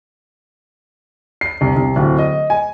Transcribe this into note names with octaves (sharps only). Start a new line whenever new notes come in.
C7
C2
C2
D1
D#5
G#5